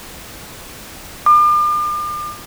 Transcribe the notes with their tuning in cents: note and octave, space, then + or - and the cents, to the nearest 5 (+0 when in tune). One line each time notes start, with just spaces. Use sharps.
D6 +40